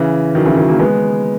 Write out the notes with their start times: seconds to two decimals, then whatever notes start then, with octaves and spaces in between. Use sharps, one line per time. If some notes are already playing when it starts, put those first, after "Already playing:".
Already playing: C#3 E3
0.35 D#3 F#3
0.45 C#3 E3
0.57 D#3 F#3
0.68 F#3 A#3
0.79 G#3 B3